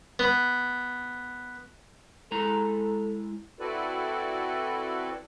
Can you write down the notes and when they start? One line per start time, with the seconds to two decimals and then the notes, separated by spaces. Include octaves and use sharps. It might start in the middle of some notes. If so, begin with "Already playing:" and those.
0.19 B3
2.32 G#3 E4 A4 A#5
3.60 C4 E4 F#4 A4 B4 D5